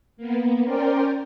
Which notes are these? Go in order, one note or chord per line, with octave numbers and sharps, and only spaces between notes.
A#3 B3
C#4 A#4 C5 D5 G5